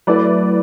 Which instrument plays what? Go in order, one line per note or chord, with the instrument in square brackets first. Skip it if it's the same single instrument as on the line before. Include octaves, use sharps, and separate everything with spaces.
[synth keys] F#3 A3 E4 [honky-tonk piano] B4 D5